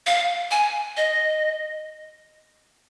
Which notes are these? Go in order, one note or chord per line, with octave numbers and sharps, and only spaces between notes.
F5
G#5
D#5